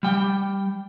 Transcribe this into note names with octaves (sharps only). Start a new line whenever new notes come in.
G3 G5